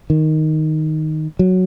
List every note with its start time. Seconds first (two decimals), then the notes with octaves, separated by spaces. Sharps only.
0.10 D#3
1.39 F#3